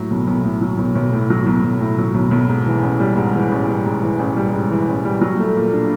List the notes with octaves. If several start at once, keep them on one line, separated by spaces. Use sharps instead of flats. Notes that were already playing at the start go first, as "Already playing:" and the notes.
Already playing: A2 F#3
B1
B1
A2
F#3
B1
B1
A2
F#3
B1
B1
A2
F#3
B1
B1
G#2
E3
A1
G3
G#2
E3
A1
G3
G#2
E3
A1
G3
G#2
E3
A1
G3
F#3
A3
A#2
D4